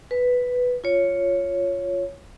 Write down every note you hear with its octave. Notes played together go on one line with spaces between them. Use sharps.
B4
F4 C#5